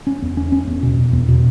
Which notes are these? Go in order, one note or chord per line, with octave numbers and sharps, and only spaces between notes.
C#4
E2
C#4
C#4
E2
B2
E2
E2
B2